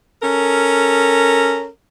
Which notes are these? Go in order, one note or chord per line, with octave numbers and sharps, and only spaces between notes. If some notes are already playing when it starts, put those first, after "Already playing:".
C#4 A4 A#4